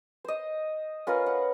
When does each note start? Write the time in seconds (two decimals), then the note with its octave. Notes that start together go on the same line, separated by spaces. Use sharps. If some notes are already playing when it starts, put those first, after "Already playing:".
0.24 C5 D#5
1.07 C#4 F4 A#4 B4
1.26 F#5